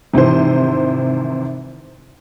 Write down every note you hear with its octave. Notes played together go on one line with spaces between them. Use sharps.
G#1 C3 E3 C5